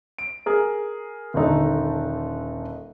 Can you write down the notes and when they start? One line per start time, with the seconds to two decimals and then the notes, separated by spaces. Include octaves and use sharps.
0.18 D7
0.46 G#4 A#4
1.34 D#1 D3 D#4 A4